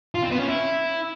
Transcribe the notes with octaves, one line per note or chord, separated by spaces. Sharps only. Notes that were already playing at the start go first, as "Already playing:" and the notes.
F4
C4
B3
C#4
E4